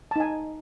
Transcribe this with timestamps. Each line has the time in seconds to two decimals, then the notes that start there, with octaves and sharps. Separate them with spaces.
0.11 A5
0.16 D#4
0.20 G#5